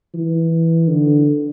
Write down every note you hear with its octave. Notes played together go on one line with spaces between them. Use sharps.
E3
D3